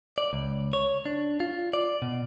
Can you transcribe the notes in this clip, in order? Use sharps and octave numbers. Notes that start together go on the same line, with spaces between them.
D5
C#2
C#5
D4
F4
D5
B2